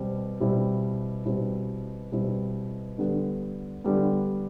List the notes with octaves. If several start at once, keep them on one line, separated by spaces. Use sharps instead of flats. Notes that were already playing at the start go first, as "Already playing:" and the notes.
Already playing: B2 G3 C4
B2 G3 C4 E4
B2 G3 C4 E4
B2 G3 C4 E4
D3 G3 B3
D3 G3 B3